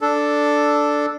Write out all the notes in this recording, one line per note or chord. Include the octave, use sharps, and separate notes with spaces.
D4 A4